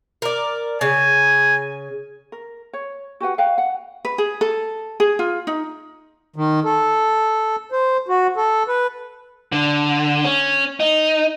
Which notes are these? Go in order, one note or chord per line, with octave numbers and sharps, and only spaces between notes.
A#4 D5
C#3 G#5
A#4
C#5
F#4 G4 B4 F#5
B4 D#5 F5 G5
F#5
B4
G#4
A4
G#4
F4
D#4
D#3
A4
C5
F#4
A4
B4
D3
C#4
D#4